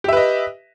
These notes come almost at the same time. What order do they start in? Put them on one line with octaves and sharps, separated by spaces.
G4 E5 B4 D#5